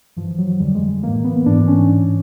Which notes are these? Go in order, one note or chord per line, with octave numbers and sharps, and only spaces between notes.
G2 E3 F3
F#3
F2 D3 G3
G#3
A2 E3 A#3
B3
G#2 E3 D4
C#4